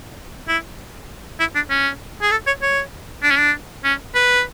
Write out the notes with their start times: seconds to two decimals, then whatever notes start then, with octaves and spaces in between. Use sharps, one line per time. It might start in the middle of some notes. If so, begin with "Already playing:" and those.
0.48 E4
1.40 E4
1.55 D4
1.70 C#4
2.22 G#4
2.31 A4
2.47 C#5
2.62 C#5
3.23 D4
3.31 C#4
3.38 D4
3.84 C#4
4.15 B4